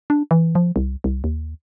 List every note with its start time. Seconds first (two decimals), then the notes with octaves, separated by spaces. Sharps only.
0.10 D4
0.31 E3
0.55 F3
0.76 C2
1.04 C2
1.24 D#2